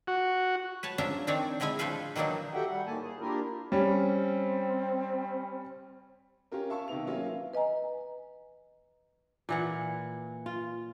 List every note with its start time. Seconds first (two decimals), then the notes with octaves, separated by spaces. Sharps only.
0.07 F#4
0.83 B4 C#5 A5
0.98 F3 C#4 D4 A#4 E5 A#5
1.27 D#3 C4 D4 C#5 D5
1.60 A2 D3 G#3 E4 G#5
1.79 F3 A3 A4 B4 F5
2.16 D#3 E3 F#3 A#3 D4 D#4
2.54 F#4 G4 A4 E5 F#5 G5
2.67 G3 F#5
2.87 A2 D#3 G3 A#3 G#5 A5
3.03 G#4
3.20 A#3 D4 E4 F4 G4 A#4
3.72 G3 C4 C#4
6.52 C#4 F4 G4 A#4
6.70 E5 F5 A5 C#6 E6
6.88 C3 D#3 B3 F7
7.06 F#3 A#3 B3 C#4 E4 F4
7.53 B4 D#5 G#5 A#5
9.49 A#2 E3 F#5
10.46 F4